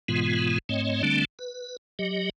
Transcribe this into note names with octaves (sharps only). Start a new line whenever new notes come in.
G#2 B2 E3 G#3 B3 F4
G#2 A3 C4 C#5 D#5
D3 G3 A3 C4 D4
B4
F#3 G4 D#5